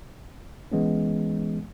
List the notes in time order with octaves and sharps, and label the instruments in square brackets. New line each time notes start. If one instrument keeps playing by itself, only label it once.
[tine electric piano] E3 G#3 B3 C#4